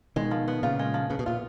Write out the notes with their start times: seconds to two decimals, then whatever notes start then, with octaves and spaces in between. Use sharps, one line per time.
0.16 B2 D#3 G#3
0.31 F3
0.48 B3
0.63 A#2 C#3 F4
0.79 G#3
0.94 F3
1.10 C#3 B3
1.19 B2
1.26 A#2 F4